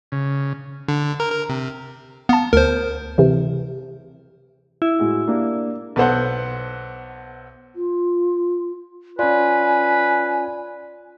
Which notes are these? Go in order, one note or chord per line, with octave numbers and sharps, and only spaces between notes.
C#3
D3
A#4
A#4
C3
B3 F5 A5
D2 A#4 C5
C3 E3
E4
A2 G#3 F#4
A#3 D4 G4
B1 B3 A4 C5 F#5
F4
C#4 F4 B4 D5 G#5